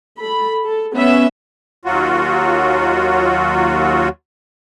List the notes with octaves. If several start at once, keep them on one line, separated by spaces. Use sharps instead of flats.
A4 B5
A4
B3 C#4 E5
D#2 F#3 F4 F#4